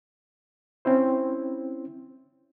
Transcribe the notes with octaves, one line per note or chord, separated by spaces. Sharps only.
C4 C#4 E4 C5